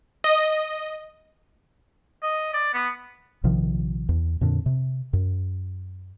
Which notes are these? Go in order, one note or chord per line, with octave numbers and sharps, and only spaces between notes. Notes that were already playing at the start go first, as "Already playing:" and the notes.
D#5
D#5
D5
B3
A#1 C3 D#3 F3
E2
F2 A#2 D3
C3
F#2